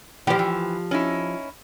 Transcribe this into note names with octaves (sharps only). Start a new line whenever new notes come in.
E3 F3 G4
E3
C#4 D#4 E4